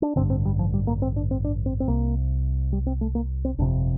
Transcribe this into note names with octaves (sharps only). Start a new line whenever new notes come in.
D4
A1 G2 D3 C4
C4
G3
F3
G3
A#3
C4
D4
C4
D4
C4
C4
C2 C3 A#3
G3
C4
A3
A#3
C4
G1 F2 C3 D4